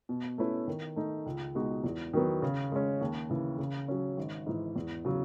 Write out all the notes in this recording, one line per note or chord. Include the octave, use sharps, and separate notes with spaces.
B2
A3 C#4 E4 B4
D#3
A3 D#4
C#2
B2 G#3 D#4 F#4
E2
D#3 F#3 B3
C#3
G#3 C#4
D#2
C#3 E3
C#3
F#3 C#4
G#1
G#2 E3
E2
C#3 F#3